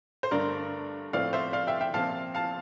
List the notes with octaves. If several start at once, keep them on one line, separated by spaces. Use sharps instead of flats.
C5
G2 D3 A3 A#4 D5
A2 F3 A3 C4 D5 F5
C5 E5
D5 F5
E5 G5
E5 G5
A#2 F3 C4 F5 A5
F5 A5